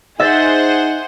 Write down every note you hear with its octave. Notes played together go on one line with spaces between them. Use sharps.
D#4 G#4 C5 E5 F#5 A6